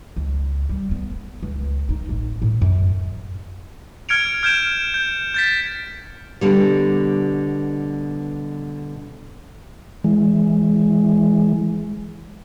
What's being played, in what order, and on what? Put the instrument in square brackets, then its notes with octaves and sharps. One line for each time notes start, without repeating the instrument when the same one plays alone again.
[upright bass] C#2
G3
B3
C#2
D#4
A1
A2
F#2
[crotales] F6 G#6 C#7 D7 F7
F6 G6 G#6 D7 E7
G6
G6 A6 B6
[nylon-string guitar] B2 D3 G3
[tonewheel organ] E3 G#3